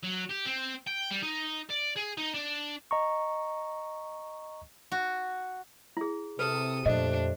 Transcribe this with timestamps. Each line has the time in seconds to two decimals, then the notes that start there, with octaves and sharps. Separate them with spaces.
0.03 F#3
0.29 G4
0.45 C4
0.87 G5
1.11 G3
1.23 D#4
1.70 D5
1.96 G#4
2.17 D#4
2.34 D4
2.91 D#5 A#5 C#6
4.92 F#4
5.97 E4 G#4
6.39 C3 A4 B4 D#6
6.86 F2 A#2 A3 D4 G4 C5 D#5